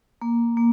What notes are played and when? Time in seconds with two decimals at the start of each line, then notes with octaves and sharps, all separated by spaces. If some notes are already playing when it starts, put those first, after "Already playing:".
0.22 A#3
0.57 A#3